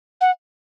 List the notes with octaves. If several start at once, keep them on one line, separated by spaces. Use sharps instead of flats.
F#5